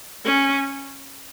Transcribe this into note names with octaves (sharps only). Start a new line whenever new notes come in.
C#4